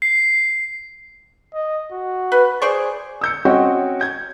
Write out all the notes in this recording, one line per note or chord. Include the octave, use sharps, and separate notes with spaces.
C7
D#5
F#4
B4
G#4 C5 D5 C#6
E6 G6 C#7
C4 C#4 F#4 C#5 D#5 G5
G6 G#6